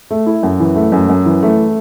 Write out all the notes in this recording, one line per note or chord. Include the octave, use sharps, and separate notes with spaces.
A3
E4
F#2
E3
A3
F#2
F#2
E3
A3